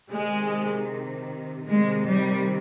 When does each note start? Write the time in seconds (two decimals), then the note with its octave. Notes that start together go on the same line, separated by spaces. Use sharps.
0.12 C3 D#3 G#3
1.68 C3 D#3 G#3
2.07 G3